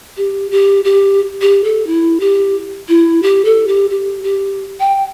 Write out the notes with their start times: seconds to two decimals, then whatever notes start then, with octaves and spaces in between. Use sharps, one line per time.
0.17 G4
0.51 G4
0.84 G4
1.42 G4
1.64 A4
1.87 E4
2.20 G4
2.89 E4
3.22 G4
3.45 A4
3.67 G4
3.90 G4
4.24 G4
4.80 G5